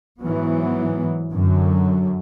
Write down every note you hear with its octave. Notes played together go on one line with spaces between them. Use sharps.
G#2 E3 F#3 B3
F#2 D3 F#3